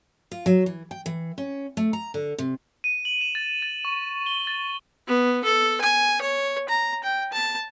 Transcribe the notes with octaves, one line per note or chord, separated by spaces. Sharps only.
F4
F#3
E3
G5
E3
C#4
A3
A#5
D3
C3
D#7
F#7
E7
A6
A6
C#6
G7
A6
B3
A4
G#5
C#5
A#5
G5
A5